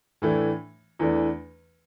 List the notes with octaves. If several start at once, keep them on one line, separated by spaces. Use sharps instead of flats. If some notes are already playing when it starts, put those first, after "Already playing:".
A2 E3 A3 D4
E2 E3 A3 D4